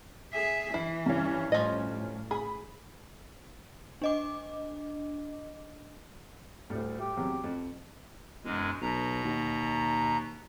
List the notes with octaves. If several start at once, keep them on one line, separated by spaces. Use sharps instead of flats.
G#4 E5
E3 E4 C7
G2 C#4
A2 F3 D#5
G#4 B5
D4 D#5 D6
D2 A2 G3
G4
E2 C3 F#3
F2
E1 F#2 G#3
B1 B2 A#5
D#2